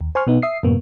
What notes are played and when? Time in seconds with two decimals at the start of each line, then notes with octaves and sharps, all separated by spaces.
0.01 D#2
0.15 C5 G#5 C6 C#6 F6
0.27 B2 B3 D#4
0.42 E5 D#6 C7
0.63 F#2 A2 C3 A#3 B3